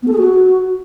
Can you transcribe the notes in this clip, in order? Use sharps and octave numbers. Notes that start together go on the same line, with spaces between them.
B3
A4
G#4
F#4